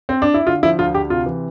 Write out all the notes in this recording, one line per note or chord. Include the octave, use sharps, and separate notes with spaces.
C4
D4
E4
D3 F4
F3 E4
D2 F4
D2 G4
C3 F4
E3